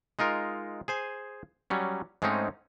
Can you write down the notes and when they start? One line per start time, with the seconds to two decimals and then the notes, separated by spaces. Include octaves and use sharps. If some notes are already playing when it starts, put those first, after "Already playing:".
0.19 G#3 D#4 F4 A#4
0.88 G#4 C5 G#5
1.70 F#3 G3 C#4
2.22 G#2 G#3 A3 C4 C#4 D#4